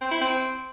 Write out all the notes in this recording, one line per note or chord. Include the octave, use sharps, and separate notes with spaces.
C4
E4
C4